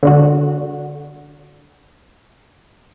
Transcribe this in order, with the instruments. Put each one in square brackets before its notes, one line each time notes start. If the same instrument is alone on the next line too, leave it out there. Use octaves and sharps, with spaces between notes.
[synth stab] D3 D4 F#4